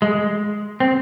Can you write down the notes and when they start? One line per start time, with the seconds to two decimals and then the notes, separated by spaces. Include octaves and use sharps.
0.02 G#3
0.80 C4